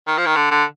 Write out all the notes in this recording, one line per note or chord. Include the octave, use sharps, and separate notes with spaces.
D#3
F3
D#3
D3
D3